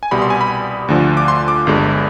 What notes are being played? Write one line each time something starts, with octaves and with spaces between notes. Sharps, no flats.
G#5
C2 B2 G3 B5
C6
G#5
B5
D2 D3 F3
D6
C6
D6
G1 G2 D3 G#3